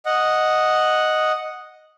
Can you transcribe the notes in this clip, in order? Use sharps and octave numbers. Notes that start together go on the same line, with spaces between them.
D#5 F#5